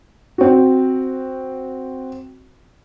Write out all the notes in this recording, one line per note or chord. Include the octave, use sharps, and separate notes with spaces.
C4 F#4